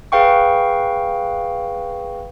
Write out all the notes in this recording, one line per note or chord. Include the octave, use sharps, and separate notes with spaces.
G#4 B4 F5 G5 C#6